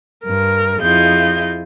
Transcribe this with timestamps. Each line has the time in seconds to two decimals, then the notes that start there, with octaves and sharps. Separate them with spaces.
0.23 G2 A#4
0.81 F2 E4 F4 G#4 D#5 G6